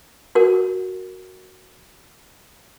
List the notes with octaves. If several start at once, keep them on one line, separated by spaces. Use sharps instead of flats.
F#4 A#4